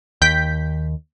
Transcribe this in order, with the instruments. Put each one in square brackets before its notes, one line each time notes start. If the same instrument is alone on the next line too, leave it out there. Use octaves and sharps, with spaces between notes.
[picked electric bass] D#2 [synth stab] G5 G6 B6